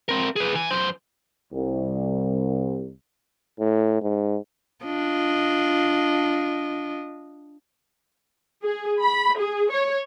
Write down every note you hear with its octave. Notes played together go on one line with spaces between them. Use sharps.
C4 A#4
G#4 B4
E3 G#5
F#2 C5
C2
A2
G#2
D4 F4 D#5
G#4
B5
G#4
C#5